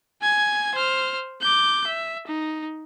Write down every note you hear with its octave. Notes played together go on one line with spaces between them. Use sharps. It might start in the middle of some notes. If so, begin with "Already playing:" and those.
G#5 G#6
C5 F6
D6 G6
E5
D#4